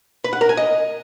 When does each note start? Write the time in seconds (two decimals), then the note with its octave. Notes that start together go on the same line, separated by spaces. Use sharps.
0.24 B4
0.33 F#5
0.41 A#4
0.49 G#5
0.57 D#5